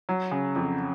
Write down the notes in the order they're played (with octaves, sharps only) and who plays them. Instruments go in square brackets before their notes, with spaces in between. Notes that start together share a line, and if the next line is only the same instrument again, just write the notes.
[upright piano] F#3
C#3
F2